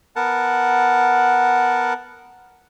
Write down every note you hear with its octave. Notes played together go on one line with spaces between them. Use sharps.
B3 A#4 F#5 A5